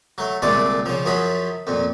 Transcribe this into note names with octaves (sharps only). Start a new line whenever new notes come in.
F#3 A3
C2 A#2 D3 G#3 A3 D5
C#3 F3
F#2 F3 F#3 G#4 B5
F2 A#2